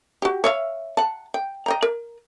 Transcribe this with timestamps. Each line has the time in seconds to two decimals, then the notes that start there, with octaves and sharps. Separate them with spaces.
0.22 F#4 G4
0.44 C#5 E5 F5
0.97 F#5 A5
1.34 G5
1.66 D#5 G5 A#5
1.82 A#4